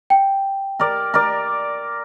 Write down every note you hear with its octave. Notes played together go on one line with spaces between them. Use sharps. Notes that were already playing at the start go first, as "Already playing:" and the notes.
G5
A#4 D5
A#4 D5